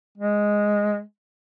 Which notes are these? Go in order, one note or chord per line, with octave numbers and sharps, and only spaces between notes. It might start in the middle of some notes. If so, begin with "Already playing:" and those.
G#3